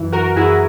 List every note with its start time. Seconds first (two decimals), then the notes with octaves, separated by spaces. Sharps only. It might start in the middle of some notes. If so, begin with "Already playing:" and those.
Already playing: F#2 E3
0.12 F#4 A#4
0.36 F#2 E3 E4 G#4